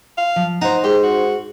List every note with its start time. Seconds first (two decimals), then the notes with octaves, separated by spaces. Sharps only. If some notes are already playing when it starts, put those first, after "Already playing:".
0.18 F5
0.36 F3
0.62 D#4 C5 F#5 A#5
0.84 G#2 G4
1.03 F#4